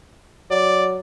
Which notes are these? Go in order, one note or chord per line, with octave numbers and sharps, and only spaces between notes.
F#3 D5